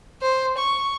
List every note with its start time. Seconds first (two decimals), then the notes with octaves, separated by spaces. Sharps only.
0.21 C5
0.58 C#6